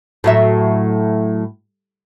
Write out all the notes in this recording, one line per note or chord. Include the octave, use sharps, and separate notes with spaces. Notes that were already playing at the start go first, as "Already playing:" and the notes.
A2 F#3 E5